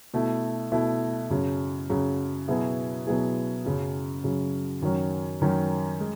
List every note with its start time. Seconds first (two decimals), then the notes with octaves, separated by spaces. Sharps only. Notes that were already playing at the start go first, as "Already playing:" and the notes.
0.14 B2 A3 E4
0.72 B2 A3 E4
1.30 F#2 C#3 F#3
1.90 F#2 C#3 F#3
2.48 B2 F#3 B3 E4 G#4
3.07 B2 F#3 B3 E4 G#4
3.65 F#2 C#3 F#3
4.24 F#2 C#3 F#3
4.82 F#2 D#3 F#3 C#4
5.41 F#2 D#3 F#3 C#4
6.00 G#3